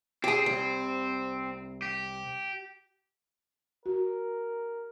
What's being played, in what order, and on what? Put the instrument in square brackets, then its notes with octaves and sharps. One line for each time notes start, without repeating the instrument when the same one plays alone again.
[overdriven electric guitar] C4 [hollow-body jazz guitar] G4 G#4
[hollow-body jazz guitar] C2
[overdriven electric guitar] G4
[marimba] F#4 [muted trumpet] A#4